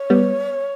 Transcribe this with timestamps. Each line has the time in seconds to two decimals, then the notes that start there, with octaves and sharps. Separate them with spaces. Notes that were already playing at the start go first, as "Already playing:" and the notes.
Already playing: C#5
0.10 G3 B3